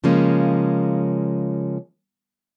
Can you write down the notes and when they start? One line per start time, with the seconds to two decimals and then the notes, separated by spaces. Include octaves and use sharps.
0.04 C#3 F3 G#3 A#3 C#4